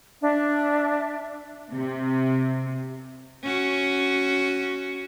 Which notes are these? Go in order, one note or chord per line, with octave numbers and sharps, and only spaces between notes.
D4 E5
C3
C#4 F#4